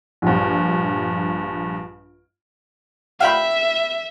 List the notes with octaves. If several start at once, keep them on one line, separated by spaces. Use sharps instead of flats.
A#1 G2
E5 F5 G5 B5